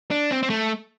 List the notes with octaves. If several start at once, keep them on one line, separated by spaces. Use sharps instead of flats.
D4
C4
C4
A3